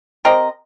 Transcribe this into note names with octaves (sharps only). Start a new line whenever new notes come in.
C4 G4 A#4 D#5